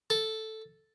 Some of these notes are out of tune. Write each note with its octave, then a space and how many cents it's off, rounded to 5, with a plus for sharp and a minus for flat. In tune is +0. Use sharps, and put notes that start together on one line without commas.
A4 +0